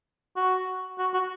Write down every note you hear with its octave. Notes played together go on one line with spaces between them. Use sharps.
F#4
F#4
F#4